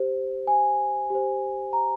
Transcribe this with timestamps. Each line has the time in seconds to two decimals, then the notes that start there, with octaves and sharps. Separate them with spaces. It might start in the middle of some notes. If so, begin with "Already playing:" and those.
Already playing: G4 C5
0.47 G#5
1.10 G4 C5
1.73 A#5